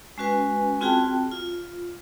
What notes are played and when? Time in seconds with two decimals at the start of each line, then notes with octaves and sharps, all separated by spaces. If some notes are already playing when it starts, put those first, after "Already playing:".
0.18 G#3 C#4 F#4 B4 G#5
0.81 C4 F4 F#4 G#4 G5 A5
1.31 F4